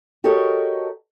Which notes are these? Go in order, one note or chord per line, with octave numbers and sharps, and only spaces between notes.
F#4 G4 A4 A#4 C#5 D#5